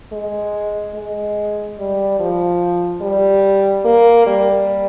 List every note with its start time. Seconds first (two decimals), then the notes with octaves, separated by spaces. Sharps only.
0.13 G#3
0.95 G#3
1.79 G3
2.19 F3
3.01 G3
3.85 A#3
4.26 G3